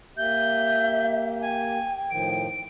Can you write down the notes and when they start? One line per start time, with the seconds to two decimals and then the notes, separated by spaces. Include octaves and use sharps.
0.17 A#3 G4 E5 G6
1.41 G5 G#5
2.11 A2 D#3 F3 D7